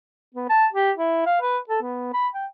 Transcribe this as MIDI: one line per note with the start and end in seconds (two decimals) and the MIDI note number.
0.35 0.49 59
0.50 0.66 81
0.73 0.91 67
0.97 1.24 64
1.26 1.38 77
1.42 1.58 71
1.69 1.81 69
1.82 2.12 59
2.14 2.28 83
2.34 2.46 79